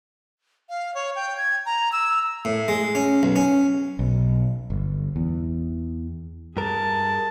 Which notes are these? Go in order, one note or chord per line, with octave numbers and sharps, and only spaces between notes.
F5
C#5
G5
G#6
A#5
E6
A2
G#3
C#4
B1
C#4
B1
G1
E2
G2 G#4 A#4 A5